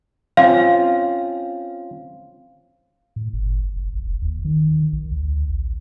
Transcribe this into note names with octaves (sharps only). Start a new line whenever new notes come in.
C4 C#4 F4 F5
A2
G1
F#1
A#1
F1
D#2
D#3
A#1
D2
A1